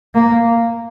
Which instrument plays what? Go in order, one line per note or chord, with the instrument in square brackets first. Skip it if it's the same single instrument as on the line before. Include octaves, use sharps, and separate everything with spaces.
[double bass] A#3